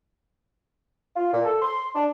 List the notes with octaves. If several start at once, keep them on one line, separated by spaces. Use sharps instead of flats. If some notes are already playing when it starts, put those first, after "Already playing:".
F4
A#2
A4
C6
D4